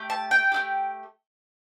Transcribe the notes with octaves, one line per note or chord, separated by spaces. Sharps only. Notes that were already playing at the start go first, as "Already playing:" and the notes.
Already playing: A3 G4
A5
G5
A3 E4 G4